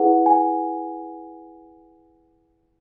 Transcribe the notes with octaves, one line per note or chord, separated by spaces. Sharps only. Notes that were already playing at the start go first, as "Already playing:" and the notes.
Already playing: E4 G#4 B4 F#5
G#5